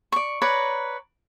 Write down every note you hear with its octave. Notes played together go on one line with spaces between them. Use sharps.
D5 C#6
B4 C#5 D5 A#5